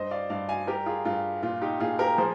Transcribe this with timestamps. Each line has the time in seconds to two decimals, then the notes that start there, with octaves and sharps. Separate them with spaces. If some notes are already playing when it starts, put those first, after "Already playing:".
Already playing: G2 C5 D#5
0.11 D5 F5
0.30 G2 D5 F5
0.49 F5 G#5
0.67 G3 G4 A#4
0.86 F4 G#4
1.05 G2 F4
1.42 A#2 F4
1.61 D#4 G4
1.80 A#2 F4 G#4
1.99 G4 A#4
2.18 F3 G#4 C5